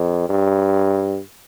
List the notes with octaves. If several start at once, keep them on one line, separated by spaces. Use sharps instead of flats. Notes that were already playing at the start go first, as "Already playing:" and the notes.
Already playing: F2
G2